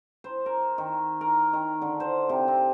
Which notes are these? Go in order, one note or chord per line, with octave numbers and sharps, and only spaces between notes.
C5
A#4
D#3
A#4
D#3
D3
C5
C3
C4